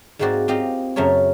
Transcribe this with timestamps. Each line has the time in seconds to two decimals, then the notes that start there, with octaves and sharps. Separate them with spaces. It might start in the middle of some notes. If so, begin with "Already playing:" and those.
0.19 G#2 G#3 A#3 C4 F#4 D5
0.48 C4 F4 G4 D#5 F5
0.96 F#2 C#3 A3 A#4 C#5